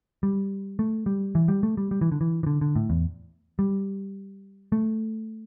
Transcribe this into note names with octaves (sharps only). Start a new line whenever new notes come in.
G3
A3
G3
E3
G3
A3
G3
G3
E3
D3
E3
E3
D3
D3
A2
E2
G3
A3